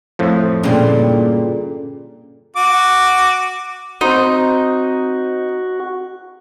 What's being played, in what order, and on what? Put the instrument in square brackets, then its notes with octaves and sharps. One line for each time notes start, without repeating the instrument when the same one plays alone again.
[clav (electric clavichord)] F2 A2 F3
[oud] G2 A#2 [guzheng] D3 C6 [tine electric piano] C#4 G#4 D5
[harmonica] F#4 D6
[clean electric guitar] C4 C5 C6 [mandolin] D#4 [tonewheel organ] F#4